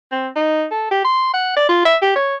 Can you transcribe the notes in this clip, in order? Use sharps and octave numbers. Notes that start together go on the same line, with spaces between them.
C4
D#4
A4
G4
C6
F#5
D5
F4
E5
G4
C#5